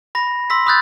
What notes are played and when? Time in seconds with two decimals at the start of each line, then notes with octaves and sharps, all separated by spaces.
0.15 B5 A#6
0.50 C6 E6 B6
0.66 B5 D#6 E6 F#6 G6 A6